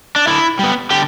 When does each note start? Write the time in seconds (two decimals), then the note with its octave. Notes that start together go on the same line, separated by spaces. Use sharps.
0.16 D4
0.27 D3 E4
0.59 G3 B3
0.90 D3 G4